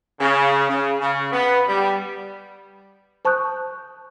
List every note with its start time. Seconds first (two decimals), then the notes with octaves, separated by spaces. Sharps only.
0.20 C#3
0.68 C#3
1.00 C#3
1.32 B3
1.67 G3
3.25 C5 A5 C#6 D#6 F#6 G6